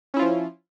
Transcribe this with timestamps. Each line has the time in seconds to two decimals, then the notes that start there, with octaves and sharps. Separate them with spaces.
0.14 C#4
0.16 E4
0.19 F4
0.22 F3